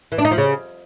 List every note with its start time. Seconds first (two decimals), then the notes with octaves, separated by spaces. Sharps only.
0.12 E3
0.18 D4
0.25 D#4
0.31 F3
0.38 C#3